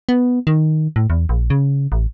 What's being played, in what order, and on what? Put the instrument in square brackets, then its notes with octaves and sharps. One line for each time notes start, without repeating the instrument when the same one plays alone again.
[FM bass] B3
D#3
A2
E2
A#1
C#3
A1